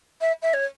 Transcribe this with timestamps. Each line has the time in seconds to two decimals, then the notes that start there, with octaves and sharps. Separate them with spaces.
0.21 E5
0.42 E5
0.53 C#5